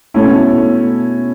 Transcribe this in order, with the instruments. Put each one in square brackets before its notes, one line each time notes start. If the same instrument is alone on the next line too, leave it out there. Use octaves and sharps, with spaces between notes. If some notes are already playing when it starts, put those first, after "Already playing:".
[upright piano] B2 A3 C#4 E4